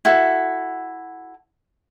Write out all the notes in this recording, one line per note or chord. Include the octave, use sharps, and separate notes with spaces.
E4 F#4 A4